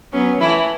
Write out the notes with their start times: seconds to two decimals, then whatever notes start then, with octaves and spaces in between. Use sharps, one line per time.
0.13 F#3 B3 C#4
0.41 E3 A3 E4